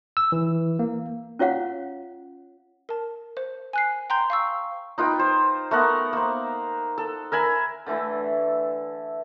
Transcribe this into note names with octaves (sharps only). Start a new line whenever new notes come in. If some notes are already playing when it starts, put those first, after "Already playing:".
E6
E3
A#3
C#4 F4 C#5 F5 F#5
A#4 A5
C5
G#5 F#6 C7
G5 A#5 C6 G6
F5 C#6 E6
D#4 F4 B4 G5
C5
A3 B3 A#4 F#5
A#3 C5
A4
A#4 E5 G#5 B5
D3 E3 A3 E4